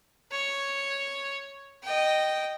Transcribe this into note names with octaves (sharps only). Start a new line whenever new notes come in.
C#5
D#5 G5